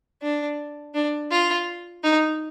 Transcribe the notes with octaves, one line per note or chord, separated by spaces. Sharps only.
D4
D4
F4
D#4